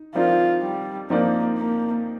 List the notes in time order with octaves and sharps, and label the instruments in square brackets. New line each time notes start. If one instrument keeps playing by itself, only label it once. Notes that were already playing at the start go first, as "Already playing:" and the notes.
Already playing: [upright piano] D#4
[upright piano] F3 C4 D#4 A#4 D5 [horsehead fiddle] F4
[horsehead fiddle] G3
[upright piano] F3 C4 D#4 A#4 D5 [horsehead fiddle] A#3
[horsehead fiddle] A#3